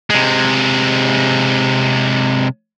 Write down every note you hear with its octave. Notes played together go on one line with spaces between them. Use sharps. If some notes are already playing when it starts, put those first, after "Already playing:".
C3 G#3